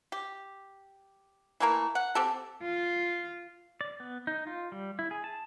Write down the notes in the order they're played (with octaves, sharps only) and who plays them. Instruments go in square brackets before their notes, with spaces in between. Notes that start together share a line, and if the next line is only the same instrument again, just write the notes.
[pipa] G4
E3 A3 A#3 A#4
F#5
C4 G4 A4
[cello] F4
[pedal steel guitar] D5
B3
D#4
F4
G3
E4
G#4
A5